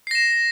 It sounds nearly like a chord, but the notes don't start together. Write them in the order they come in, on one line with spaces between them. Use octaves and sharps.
C7 A#6 E7